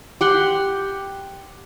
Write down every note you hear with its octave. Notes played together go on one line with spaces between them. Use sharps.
G4 F#5 C6